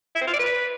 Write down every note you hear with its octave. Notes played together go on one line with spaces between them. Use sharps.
E4
C4
F4
D5
B4